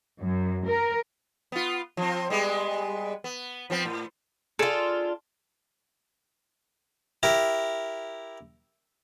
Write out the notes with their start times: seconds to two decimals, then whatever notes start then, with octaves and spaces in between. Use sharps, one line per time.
0.21 F#2
0.67 A#4
1.52 B3 F4
1.97 F3 C4
2.30 G3 G#3 B3
3.24 B3
3.70 F3 B3 C4
3.85 A2
4.59 D4 F4 G#4 A4
7.23 E4 G4 A#4